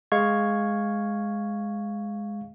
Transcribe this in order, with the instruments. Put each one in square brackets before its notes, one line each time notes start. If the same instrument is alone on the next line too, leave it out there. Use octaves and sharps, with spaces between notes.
[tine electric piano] G#3 F5 C#6 G#6